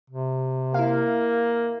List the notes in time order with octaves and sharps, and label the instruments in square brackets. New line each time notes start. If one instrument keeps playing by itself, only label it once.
[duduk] C3
[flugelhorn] A#3 [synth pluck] E4 F5